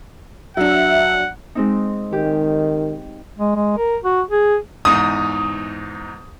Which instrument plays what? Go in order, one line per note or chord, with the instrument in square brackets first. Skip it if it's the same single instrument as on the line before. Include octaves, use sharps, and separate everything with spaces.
[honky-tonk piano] F#3 D4 [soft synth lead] E5 [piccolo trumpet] F#5
[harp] G#3 C4 D#4
[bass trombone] D#3 [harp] G4
[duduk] G#3
G#3
A#4
F#4
G#4
[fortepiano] E2 G#2 D#4 [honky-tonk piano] D#6